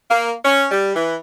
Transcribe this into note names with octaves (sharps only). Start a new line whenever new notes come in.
A#3
C#4
G3
E3